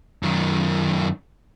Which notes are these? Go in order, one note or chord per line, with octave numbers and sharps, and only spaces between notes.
F#2 D#3